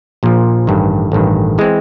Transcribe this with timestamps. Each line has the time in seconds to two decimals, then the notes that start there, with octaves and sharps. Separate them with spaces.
0.23 A#1 A#2 F3
0.67 A1 G2 D#3
1.12 A1 G2 D#3
1.58 E3 G#3 C4